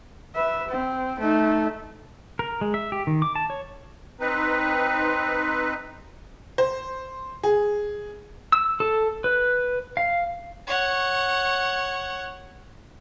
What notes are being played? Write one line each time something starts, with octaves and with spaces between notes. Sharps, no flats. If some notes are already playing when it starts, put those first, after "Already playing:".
B4 E5
C4
A3 D#4
A#4
G#3
E5
G4
D#3
D6
A5
C#5
C4 D#4 B4
C5
G#4
E6
A4
B4
F5
C#5 F#5